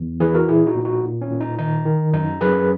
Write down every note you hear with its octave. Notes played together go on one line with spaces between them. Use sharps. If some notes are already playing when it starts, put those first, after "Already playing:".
Already playing: E2
E3 G#4 B4
F#4 A#4
A#2 E4 G#4
D#4 F#4
A#2
D#4 F#4
A#2
C#4
A#2
D#4
D#3 D#4
D#3
F#2 D#4
F#2 G#4 B4